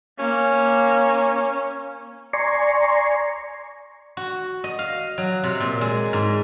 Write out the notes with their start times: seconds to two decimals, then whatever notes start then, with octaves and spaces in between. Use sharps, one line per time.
0.19 A#3 C#4
2.33 D5 G#5 A#5 C6 C#6
4.17 F#4
4.64 D#5
4.79 F5
5.18 F#3
5.44 C3
5.60 A#2
5.81 G#3
6.13 G#2